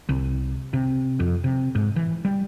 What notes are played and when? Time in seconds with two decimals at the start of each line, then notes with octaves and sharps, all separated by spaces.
0.09 C2
0.73 C3
1.20 F2
1.44 C3
1.75 G#2
1.96 E3
2.25 G3